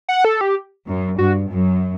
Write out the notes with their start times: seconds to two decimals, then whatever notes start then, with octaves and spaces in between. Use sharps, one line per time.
0.09 F#5
0.25 A4
0.41 G4
0.88 F#2
1.18 G2 F#4
1.50 F#2